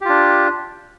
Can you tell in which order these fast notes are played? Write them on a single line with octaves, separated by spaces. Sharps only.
G4 F4 D4